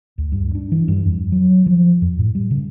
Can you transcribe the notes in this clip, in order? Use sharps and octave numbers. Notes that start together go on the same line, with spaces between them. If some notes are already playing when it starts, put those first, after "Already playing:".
D2
G2
D4
E3
G2
F2
F#3
F3
F2
A2
G3
C#3